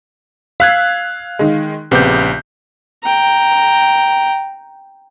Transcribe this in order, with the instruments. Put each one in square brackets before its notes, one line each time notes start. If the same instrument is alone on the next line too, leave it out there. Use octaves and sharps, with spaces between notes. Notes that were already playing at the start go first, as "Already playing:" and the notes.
[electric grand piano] F5 F#6 G#6 [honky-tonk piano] E6 B6 C7
[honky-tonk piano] D#3 G#3
[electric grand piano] A#1 G4 G6 [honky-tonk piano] C#3 B3 C4
[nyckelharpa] G5 A#5